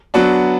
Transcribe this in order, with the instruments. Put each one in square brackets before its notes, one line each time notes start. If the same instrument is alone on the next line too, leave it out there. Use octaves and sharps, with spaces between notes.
[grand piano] F#3 B3 D4 F#4